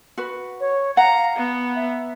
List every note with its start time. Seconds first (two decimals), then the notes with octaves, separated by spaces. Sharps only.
0.18 F#4 B4
0.60 C#5
0.97 F5 F#5 A#5
1.36 B3
1.76 E5